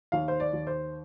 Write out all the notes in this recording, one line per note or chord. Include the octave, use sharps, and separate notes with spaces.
D#2 F5
C5
D5
D#2
C5